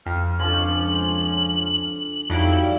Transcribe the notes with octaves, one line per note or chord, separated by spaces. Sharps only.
F2 F6
C#2 F3 C#4 D4 A4 F#7
F2 F#3 G3 D#4 E4 F#4 F5 D7